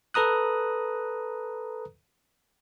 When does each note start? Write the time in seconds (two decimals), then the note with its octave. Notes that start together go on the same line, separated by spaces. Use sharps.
0.14 A4 B4 A#5 D#6 F#6